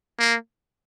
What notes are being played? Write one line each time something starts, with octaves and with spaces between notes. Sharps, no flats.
A#3